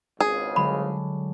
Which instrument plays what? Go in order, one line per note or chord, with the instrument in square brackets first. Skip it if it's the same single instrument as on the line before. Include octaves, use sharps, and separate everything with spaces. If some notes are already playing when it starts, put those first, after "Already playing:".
[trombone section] G#1 C#2 C#3 [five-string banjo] G#4
[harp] D3 F#3 G#3 [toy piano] B5